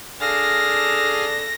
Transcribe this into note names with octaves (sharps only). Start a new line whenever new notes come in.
D4 G#4 A4 F5 F6 A#6